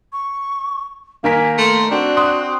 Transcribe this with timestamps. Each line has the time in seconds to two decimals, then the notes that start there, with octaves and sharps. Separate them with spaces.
0.13 C#6
1.24 D#3 A#3 A#4 G#5 B6
1.58 A3 C6
1.91 C4 D4 F#4
2.17 C6 D#6 F#6